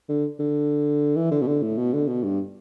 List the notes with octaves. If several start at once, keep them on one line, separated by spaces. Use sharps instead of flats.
D3
D3
E3
D3
B2
D3
A2
B2
D3
B2
G2